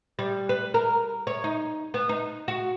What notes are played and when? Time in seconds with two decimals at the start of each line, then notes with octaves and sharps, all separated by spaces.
0.19 G3
0.49 B4
0.74 A#4
1.27 C#5
1.44 D#4
1.94 B3
2.09 D#4
2.48 F#4